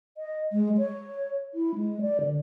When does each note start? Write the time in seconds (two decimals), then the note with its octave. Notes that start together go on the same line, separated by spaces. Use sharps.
0.18 D#5
0.53 G#3
0.78 C#5
1.54 E4
1.75 G#3
2.01 D5
2.20 D3